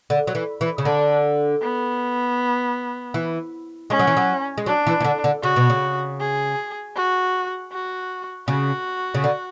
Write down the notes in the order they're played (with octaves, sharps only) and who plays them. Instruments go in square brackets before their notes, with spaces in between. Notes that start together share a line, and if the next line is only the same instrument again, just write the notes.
[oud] D3
F#3
E3
E3
C#3
[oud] D3 [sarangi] D4
[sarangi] B3
[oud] E3
[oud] G#3 [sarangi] C#4
[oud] F#3
E3
F#3
G#3
[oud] F#3 [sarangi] D4
[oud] E3
E3
D3
D3
[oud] C#3 [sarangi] F#4
[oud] B2
C#3
[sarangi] G#4
F#4
F#4
[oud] C#3 [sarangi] F#4
[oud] C#3
D3